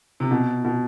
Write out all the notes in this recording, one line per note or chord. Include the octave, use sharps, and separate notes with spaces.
C3
B2
B2